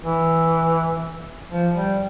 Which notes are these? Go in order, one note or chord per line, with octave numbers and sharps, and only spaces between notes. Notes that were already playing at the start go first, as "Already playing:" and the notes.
E3
F3
G3